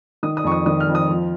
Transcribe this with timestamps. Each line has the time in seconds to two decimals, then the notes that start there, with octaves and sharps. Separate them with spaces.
0.23 D#3 D#6
0.37 D#6
0.44 F2 C#6
0.52 D#6
0.66 D#3 D#6
0.80 F6
0.87 F2
0.95 D#6
1.09 F3